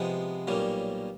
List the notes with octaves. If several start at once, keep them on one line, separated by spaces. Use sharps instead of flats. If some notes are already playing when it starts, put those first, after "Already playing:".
Already playing: C3 F3 G#3 B3
B1 A#2 G3 A#3 C#4